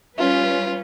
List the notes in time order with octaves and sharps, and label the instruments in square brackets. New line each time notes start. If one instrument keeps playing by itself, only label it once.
[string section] G3 C#4 B4 [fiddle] F4